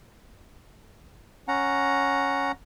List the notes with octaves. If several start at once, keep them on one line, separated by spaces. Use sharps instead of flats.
C#4 F#5 A#5